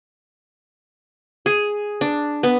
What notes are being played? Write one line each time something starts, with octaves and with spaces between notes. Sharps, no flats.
G#4
D4
B3